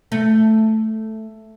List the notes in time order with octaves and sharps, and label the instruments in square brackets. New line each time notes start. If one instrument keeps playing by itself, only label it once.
[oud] A3